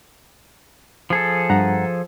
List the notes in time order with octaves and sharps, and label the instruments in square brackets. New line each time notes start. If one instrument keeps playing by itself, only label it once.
[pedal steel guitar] F3 G#4 A4
[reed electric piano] G2 F#5 A#5